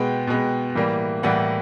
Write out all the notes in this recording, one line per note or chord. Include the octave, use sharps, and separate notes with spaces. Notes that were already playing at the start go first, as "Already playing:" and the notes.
Already playing: B2 G#3 B3 G5
B2 G#3 B3
A2 E3 G3 A#3
A2 E3 G3 A#3 F#5